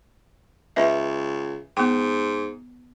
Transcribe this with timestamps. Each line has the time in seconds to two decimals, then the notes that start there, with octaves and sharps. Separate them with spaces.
0.76 C#2 B4 D#5 E5
1.77 G#2 B3 G5